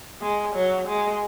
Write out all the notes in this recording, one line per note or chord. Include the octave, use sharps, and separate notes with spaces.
G#3
F#3
G#3